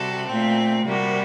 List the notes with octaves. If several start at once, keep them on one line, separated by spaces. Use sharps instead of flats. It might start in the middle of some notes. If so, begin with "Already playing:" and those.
Already playing: C3 G3 F#4 A4
A#2 A3 C4
C3 G3 A#3 F#4